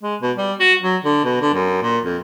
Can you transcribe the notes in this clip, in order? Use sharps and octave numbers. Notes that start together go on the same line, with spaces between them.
G#3
B2
G3
F#4
F#3
D3
B2
D3
F#2
A#2
F2